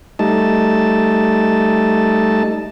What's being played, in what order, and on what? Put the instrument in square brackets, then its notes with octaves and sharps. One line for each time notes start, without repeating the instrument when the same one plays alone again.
[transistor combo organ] G3 A3 D#4 A5